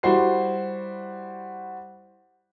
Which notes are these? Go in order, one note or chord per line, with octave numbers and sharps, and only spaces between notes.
G3 E4 F#4 C5 C7